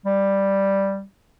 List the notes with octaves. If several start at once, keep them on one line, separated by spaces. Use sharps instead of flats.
G3